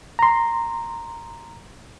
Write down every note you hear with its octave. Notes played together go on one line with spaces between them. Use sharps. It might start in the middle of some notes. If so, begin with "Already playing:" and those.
A#5 C6